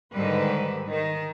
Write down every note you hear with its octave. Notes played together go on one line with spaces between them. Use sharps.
G#2 D3 D#3 G3 B4
D#3